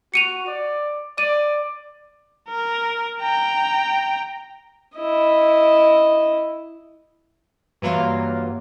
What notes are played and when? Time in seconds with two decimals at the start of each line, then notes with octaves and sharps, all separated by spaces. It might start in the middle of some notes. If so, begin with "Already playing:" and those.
0.14 F#4 C#7 D#7 F7
0.47 D5
1.18 D5 D#7
2.49 A#4
3.20 G5 A#5
4.97 E4 D#5
7.82 G2 E3 F#3 A#3 F4